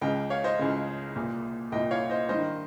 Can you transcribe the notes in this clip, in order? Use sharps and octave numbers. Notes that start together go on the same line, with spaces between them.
C#2 C#3 D#5 G5
C#5 F5
C5 D#5
C#2 C#3
C2 A#2
C2 A#2 D#5 G5
C#5 F5
C5 D#5
G2 D#3 C5 D#5